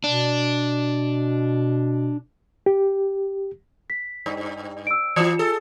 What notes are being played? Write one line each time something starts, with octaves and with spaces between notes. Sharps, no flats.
B2 D4
G4
B6
G2
E6 D7
E3 F4 C#7
G#4 A4